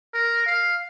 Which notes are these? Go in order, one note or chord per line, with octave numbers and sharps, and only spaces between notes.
A#4
F5